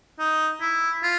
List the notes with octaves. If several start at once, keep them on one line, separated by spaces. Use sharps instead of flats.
D#4
E4
F4